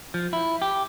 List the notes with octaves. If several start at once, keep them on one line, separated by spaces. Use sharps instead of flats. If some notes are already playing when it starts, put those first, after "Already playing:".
F3
E4
G4